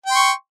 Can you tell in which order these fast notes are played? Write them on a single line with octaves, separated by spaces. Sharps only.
G5 C6 C#6